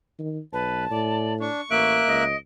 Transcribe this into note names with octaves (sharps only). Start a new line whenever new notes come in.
D#3
B1 B4 A5
A2 D5
D4 C#6
A1 A#3 E5 F#6 D7
C#2 D#5